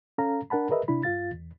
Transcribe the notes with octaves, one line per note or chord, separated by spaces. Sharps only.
C#4 A4 F5 A#5
D4 A#4 F#5 A5 B5
G#4 A#4 B4 D#5 E5 B5
C3 D4 E4 B5
G2 F4 F5 A6
E2